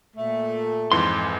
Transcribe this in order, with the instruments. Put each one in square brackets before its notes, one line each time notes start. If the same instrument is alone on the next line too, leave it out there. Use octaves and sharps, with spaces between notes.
[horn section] A#2 A3
[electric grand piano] F2 G#2 E3 [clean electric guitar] C6